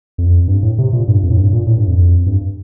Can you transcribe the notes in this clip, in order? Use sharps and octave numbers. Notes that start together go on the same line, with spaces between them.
F2
G2
A2
C3
A#2
G2
F2
A2
G2
A#2
A2
G2
F2
G2